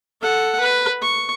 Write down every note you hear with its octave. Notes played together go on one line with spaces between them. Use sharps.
A4 F#5
B4
C#6